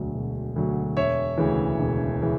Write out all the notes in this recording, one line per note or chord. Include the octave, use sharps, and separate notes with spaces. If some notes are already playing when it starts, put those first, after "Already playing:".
Already playing: E1 D2 D3 F#3
E1
D2 D3 F#3
E1 C#5 E5
D2 C#3 E3
E1
C#3 E3